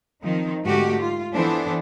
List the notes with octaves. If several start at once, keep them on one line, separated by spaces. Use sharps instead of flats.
D#3 F3 C4 D#4
G#2 D3 A3 F#4 G4
F4
E3 B3 D4 A4 C5